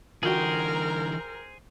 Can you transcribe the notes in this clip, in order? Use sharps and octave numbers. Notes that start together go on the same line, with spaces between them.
D3 E3 F4 F#4 G#4 A#4 C5 G5